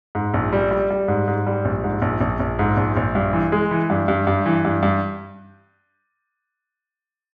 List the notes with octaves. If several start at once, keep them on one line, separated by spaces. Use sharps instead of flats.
G#2
A#1
G3
G3
G3
G#2
G#2
G3
A#1
G#2
A#1
A#1
A#1
G#2
A#1
A#1
G2
E3
G#3
E3
G2
G2
G2
E3
G2
G2